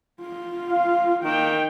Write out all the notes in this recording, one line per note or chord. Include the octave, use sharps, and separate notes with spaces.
F4
F5
D#3 A#3 G5